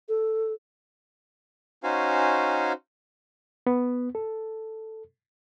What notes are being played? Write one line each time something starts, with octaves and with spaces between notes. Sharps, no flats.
A4
C#4 D#4 F#4 C5 F5 G#5
B3
A4